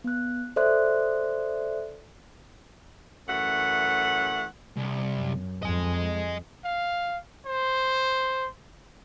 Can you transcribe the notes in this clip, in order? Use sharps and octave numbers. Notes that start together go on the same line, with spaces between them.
B3 F#6
A4 C5 D5 E5 C6 F#6
F#2 E3 A3 F#5
C2
F#2
F2 D#5 G#5
F5
C5